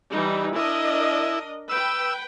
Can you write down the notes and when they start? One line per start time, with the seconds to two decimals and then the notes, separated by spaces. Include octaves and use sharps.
0.10 E3 G3 D#4
0.56 D4 E4 A#4 D#5
1.69 B4 G5 E6